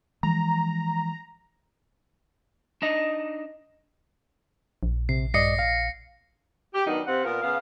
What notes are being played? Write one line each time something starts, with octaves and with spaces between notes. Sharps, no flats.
E3 F3 G#3 A#5
D4 D#4 D#5
A#1
C3 C7
G2 D5 D#5 A#6 C7 C#7
F5
G4
D#3 F#3 B3 D4 D#4
C3 C4 F5 F#5
A#2 B3 F4 A#4
C#3 B3 F5